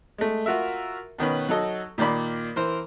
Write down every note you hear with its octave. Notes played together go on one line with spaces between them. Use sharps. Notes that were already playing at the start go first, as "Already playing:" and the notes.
G#3 A3
F4 F#4 A#4 E5
B2 D#3 C#4 B4
F#3 D#4 F#4 A4 D#5
A#2 D#3 A#3 D5 B5
E3 A#4 C5